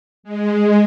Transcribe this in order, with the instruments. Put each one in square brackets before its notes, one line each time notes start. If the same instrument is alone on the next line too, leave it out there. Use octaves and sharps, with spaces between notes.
[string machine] G#3